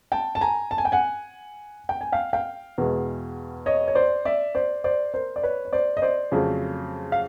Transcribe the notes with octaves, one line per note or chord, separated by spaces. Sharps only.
G5 A5
A5
G#5 A#5
A5
G#5
G5
F#5 G#5
G5
G#5
F5 G5
F5 G5
E2 B2 G#3
C#5 D#5
C#5
C5 D5
D5 E5
C5 D5
C5 D5
A#4 C5
D5
B4 C#5
C#5
C5 D5
D#5
C5 D5
F2 C#3 F#3 A3
F5